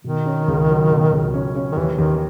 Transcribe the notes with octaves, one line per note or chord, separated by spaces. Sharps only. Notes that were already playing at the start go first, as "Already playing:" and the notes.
B2 D#3
C#4
C#2
F#3
B2
C#2
C#4
C#4
D#3
D#2 E3
D#2 D#3